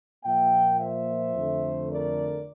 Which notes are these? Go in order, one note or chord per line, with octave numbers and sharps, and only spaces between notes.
A#2 F3 A#3 E5 G5
C5 E5
F2 D3 A3
A#4 D5